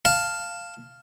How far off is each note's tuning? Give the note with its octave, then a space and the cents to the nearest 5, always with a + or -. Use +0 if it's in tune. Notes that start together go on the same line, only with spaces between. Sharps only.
F5 +0 A5 +0